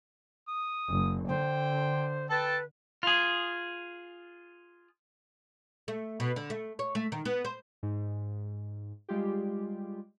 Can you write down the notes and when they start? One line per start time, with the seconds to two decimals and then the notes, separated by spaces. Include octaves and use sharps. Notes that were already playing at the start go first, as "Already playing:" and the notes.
0.48 D#6
0.89 F#1
1.28 D3 C5 G5
2.30 A4 B4 G5 A5
3.03 F4 G#4
5.88 A3
6.20 B2
6.36 D3
6.50 A3
6.79 C#5
6.95 A3
7.12 D#3
7.25 B3
7.45 C5
7.83 G#2
9.09 G3 G#3 F4 G4